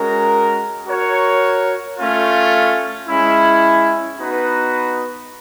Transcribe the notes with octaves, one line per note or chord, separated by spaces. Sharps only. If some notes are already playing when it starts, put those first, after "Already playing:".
Already playing: G#3 C#4 F#4 A#4
F#4 A#4 C#5
A3 C#4 F4
G#3 C#4 E4
B3 D#4 F#4 B4